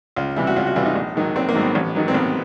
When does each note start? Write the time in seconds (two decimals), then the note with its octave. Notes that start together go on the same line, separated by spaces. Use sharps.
0.16 C#2 F4
0.36 C3 E3 G3 E4
0.47 F#4
0.56 C#2 F4
0.66 F#4
0.76 C3 E3 G3 F4
0.86 D#4
0.96 A#1
1.15 G#2 D#3 F#3
1.36 A#1 C4
1.49 A#3
1.55 G#2 D#3 F#3 C4
1.61 B3
1.75 A1
1.95 G#2 D#3 F#3
2.08 C4
2.14 A1 B3